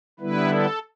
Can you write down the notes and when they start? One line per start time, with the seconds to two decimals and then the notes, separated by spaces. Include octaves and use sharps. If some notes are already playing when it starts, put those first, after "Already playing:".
0.20 D3 G3 B3 E4 B4
0.48 A4